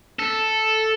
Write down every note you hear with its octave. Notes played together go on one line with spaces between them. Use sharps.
A4